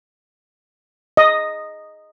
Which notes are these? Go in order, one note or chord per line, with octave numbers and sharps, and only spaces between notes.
D#5